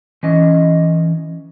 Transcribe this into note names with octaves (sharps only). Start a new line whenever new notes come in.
E3 C#4 D#5